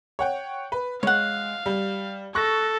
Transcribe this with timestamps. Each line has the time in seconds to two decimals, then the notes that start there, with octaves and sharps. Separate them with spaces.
0.19 C#5 F#5 G5
0.72 B4
1.03 G#3 C#5 F5 F#5
1.66 G3
2.35 A4 C#6 F#6 A#6